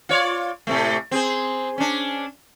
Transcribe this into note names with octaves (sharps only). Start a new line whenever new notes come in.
F4 C#5 D5
A2 C3 A3
C4 G#4 C5
C#4 D4